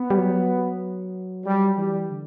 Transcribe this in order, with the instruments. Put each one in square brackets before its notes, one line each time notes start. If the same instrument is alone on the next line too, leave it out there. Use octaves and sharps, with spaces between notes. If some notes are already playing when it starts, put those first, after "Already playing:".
Already playing: [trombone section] B3
[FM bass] G3
F#3
[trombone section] G3
[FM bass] E3 [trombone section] G3
[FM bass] D3